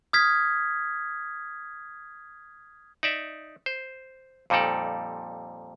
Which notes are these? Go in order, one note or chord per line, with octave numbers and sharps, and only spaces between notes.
D#6 F6 G#6 B6
D#4 D5 E5
C5
F2 A#2 G3 D#4 A4 D5